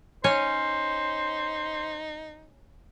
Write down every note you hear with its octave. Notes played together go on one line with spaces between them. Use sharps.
C#4 D#4 C5 C#5 G#5